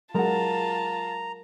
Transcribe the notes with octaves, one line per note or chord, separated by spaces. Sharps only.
F#3 G#3 F4 A#4 F#5 A5 A#5